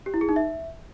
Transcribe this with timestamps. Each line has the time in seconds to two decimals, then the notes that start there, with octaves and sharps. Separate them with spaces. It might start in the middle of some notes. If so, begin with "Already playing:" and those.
0.06 G4
0.14 E4
0.21 G#4
0.29 D#4
0.36 E5